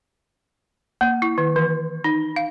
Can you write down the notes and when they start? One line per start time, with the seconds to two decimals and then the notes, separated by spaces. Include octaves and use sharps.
1.01 A#3
1.22 E4
1.38 D#3
1.56 E3
2.04 D#4
2.36 F5